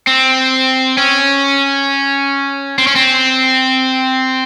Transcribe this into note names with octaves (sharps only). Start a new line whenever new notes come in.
C4
C#4
C4
C#4
C4